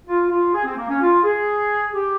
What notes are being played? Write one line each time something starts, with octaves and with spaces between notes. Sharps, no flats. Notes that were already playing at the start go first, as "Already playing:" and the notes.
F4
F4
G#4
C4
A#3
C#4
F4
G#4
G4